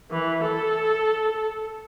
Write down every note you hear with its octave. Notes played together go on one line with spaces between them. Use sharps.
E3
A4